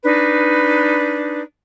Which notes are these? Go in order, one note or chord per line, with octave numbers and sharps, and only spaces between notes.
D4 D#4 B4